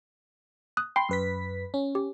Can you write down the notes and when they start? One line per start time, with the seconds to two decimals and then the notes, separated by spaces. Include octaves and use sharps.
0.77 D#6 F#6
0.96 G5 B5 C6
1.09 F#2 B4 B6
1.74 C#4
1.95 G4